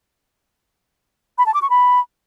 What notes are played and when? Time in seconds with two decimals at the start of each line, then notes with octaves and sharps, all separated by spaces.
1.38 B5
1.46 A5
1.54 D6
1.62 C#6
1.70 B5